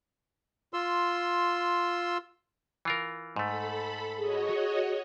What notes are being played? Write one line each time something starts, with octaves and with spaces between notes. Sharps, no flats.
F4 C6 E6
E3 F4 A#4
G#2 A3 A4 B5
F#4 G#4 C#5 D#5